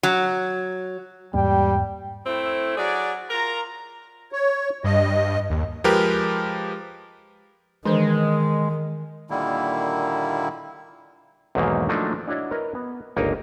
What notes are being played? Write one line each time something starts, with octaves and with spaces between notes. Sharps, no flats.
F#3
E2 G#2 G3 A#3 G5
A3 C4 E4
F#3 G#4 D5
F4 A#4 A#5
C#5
G2 D#5
D#2
F3 G#3 G4 A#4 B4
D#3 E3 G#3 D4 C5
A#2 D3 D#3 G3 A#3 E4
B1 E2 G#2 D#3 E3 A#3
F3 F#3 A3 A#3 D4 D#4
D4 E4 F#4 C#5 D#5
A#4 B4 C#5 D#5
B3
G1 C#2 A#3 D#4 A#4 G#5